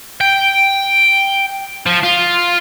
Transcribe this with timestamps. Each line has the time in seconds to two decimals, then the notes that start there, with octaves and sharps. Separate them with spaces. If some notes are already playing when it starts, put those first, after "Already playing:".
0.21 G5
1.86 F3
2.03 F4